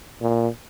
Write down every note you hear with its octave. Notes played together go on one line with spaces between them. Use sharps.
A#2